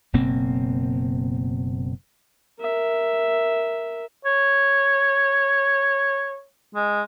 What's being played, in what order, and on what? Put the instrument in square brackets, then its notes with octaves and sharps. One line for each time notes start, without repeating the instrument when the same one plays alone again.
[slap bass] F#1 B2 A#3 C4
[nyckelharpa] A#4 E5
[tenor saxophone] C#5
G#3